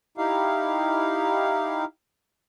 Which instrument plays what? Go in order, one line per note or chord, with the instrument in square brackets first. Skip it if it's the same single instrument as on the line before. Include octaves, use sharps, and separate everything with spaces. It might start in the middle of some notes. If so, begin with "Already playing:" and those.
[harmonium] D#4 E4 G4 F5